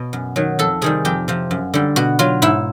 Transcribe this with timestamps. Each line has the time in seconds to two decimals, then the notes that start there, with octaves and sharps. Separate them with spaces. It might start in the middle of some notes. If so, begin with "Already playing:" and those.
Already playing: B2
0.13 F#2
0.36 D#3 F#3
0.59 F2 A4
0.82 C3 D#3 G3 G#4
1.05 F2 G4
1.28 C3 F3
1.51 F#2
1.74 D3 G3
1.96 B2 F#4
2.19 F#3 F4
2.42 G#2 E4